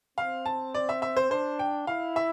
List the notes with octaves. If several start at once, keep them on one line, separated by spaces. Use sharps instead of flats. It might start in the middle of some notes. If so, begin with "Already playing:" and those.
C4 F5
A5
D5
E5
E5
C5
D4 C5
G5
E4 F5
E5